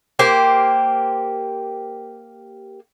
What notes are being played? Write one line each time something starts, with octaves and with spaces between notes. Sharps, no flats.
A#3 G4 C5